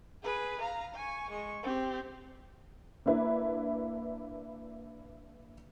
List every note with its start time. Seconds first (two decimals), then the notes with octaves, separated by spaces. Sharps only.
0.23 G#4 B4
0.62 F5 A#5
0.95 G#5 C#6
1.31 G#3 C#6
1.63 C4 G4
3.06 A#3 D4 E4 B4